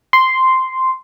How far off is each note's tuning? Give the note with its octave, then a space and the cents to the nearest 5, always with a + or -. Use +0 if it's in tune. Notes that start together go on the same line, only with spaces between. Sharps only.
C6 -5